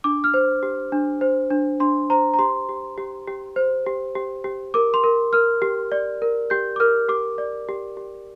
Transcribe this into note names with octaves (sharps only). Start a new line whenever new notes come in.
D4 D6
F6
C5
G4
D4
C5
D4
D4 C6
C5 A#5
A#5
G4 C6
G4
G4
G4
C5
G4
G4
G4
A#4 D6
C6
A#4
A#4 F6
G4
D5
A#4
G4 G6
D6
A#4 F6
G4 D6
D5
G4
G4